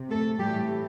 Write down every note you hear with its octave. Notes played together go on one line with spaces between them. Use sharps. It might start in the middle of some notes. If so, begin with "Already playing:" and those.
Already playing: C3
A3 A4
A2 E3 G3 A3 G4